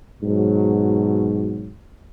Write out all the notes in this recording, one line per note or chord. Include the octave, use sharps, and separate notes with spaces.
G#2 B2 F#3